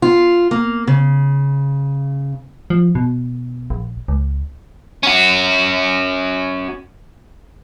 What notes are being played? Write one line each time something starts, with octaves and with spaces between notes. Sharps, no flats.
F4
A#3
C#3
F3
B2
A#1
C#2
C#4 F#4